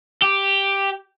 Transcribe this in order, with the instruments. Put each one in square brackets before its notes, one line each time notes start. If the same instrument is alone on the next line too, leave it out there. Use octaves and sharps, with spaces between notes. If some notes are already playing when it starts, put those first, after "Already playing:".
[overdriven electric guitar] G4